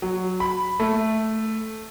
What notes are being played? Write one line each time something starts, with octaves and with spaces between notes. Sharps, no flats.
F#3
B5
A3